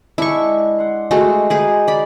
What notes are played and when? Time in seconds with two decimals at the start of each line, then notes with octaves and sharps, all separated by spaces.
0.18 G#3 D4 E4 C#6
0.79 F#5 C6
1.11 G#3 A3 F#4
1.50 D#4 G#4 B4 G#5 C6
1.88 D5 B5